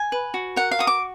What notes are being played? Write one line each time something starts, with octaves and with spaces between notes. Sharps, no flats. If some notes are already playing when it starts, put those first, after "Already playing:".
Already playing: G#5
B4
F#4
A#4 F#5
F5
F#4 D#6
D6